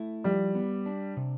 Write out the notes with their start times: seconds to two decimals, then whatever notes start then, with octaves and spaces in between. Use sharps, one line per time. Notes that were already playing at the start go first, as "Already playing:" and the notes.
Already playing: A3 E4
0.24 F3 G3
0.55 B3
0.86 D4
1.17 C3